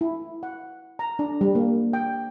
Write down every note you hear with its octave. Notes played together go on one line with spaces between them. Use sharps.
E4
F#5
A#5
D4
G3
A#3
G5